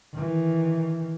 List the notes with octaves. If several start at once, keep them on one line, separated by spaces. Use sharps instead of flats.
D#3 E3